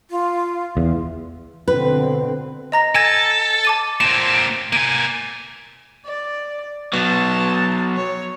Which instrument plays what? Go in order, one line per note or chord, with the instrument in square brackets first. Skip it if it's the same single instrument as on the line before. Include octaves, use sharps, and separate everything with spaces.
[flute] F4
[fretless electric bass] E2
[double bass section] B2 D3 C4 [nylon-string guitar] B4
[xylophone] D#5 A#5 A#6
[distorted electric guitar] A4 [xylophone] G#5 G#6 A#6
[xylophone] A5 D6 D#7
[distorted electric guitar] A#2 C4 [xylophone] E7
[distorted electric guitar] A#3 G#5 [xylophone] D#7
[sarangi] D5
[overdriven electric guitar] F#3 B3 [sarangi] A5
[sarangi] C#5